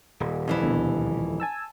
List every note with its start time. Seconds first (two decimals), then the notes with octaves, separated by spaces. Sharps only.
0.20 D#1
0.48 F2 E3 E4
0.63 D2 B2 D3
1.40 G#5 A5 E6